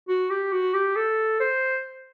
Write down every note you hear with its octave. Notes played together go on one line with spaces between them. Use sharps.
F#4
G4
F#4
G4
A4
C5